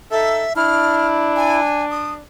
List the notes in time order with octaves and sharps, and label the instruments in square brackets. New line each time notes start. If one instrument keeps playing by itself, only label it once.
[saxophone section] D#4 A4 [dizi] E5
[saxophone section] D4 [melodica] E4 [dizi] F6
[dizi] G#5
D#6